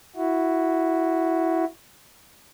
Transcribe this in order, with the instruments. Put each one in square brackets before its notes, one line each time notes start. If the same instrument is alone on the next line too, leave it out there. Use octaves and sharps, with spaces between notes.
[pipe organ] E4 F#4